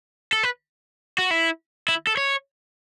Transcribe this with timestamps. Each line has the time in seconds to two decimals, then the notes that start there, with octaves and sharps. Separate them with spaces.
0.33 A4
0.43 B4
1.18 F#4
1.31 E4
1.88 E4
2.07 A4
2.17 C#5